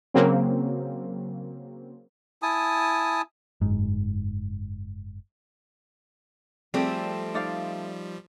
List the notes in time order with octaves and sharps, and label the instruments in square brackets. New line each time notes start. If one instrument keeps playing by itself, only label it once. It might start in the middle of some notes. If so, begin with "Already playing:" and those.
[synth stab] C#3 F#3 A#3 C4
[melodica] E4 G#5 A5 D#6
[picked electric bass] F#1 G#2
[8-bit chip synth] F3 G3 [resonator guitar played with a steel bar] A3 C4 [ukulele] G#4 D5
[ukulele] D#4 D5 F5